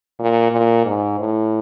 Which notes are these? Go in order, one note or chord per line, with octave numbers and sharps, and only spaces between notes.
A#2
A#2
G#2
A2